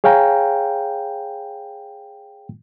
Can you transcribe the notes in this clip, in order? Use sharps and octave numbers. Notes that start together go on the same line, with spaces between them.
G#4 C#5 F5 G5 G#5 A#5